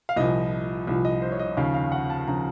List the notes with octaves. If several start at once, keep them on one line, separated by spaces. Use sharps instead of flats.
F5
C2 A#2 F3 D#5
C2 A#2 F3
D#5
C5
C#5
D#5
D#2 C#3 F3 F5
F5
F#5
A5
C#3 F3 A#5